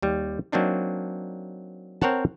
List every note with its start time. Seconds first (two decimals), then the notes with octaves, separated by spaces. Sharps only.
0.02 D#2 G3
0.52 F#3 A#3 C4 D4 D#4
2.02 C4 A#4 C#5 F#5 A5